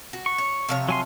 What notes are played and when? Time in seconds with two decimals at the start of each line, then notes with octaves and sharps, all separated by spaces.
0.13 F#4
0.26 C#6
0.38 C#5
0.69 C3 F3 C#5
0.89 F#3 G#5 C6